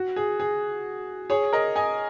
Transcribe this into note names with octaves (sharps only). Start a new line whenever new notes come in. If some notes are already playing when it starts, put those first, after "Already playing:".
Already playing: F#4
G#4
G#4
G#4 C#5
A#4 D#5
D#5 G#5